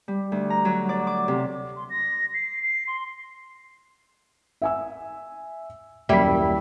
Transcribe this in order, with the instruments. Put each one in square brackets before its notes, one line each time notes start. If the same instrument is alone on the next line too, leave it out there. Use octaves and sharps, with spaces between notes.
[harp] G3
D2
A#5
F#3
D5
D6
C3
[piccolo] C6
A#6
C7
C7
C6
[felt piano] E5 G#5 E6
[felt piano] D#1 F#2 B6 [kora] G3 E4